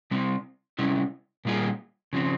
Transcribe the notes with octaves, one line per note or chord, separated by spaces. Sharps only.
C3 G3 C4
C3 G3 C#4 E4
A#2 G3 A#3 F4 G#4
C#3 F3 C4